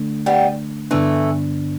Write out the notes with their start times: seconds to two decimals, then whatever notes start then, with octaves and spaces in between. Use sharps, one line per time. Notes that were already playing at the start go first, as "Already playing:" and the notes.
Already playing: D3 A3 D4
0.26 G3 B3
0.91 G2 D3 E3 A3 B3 D4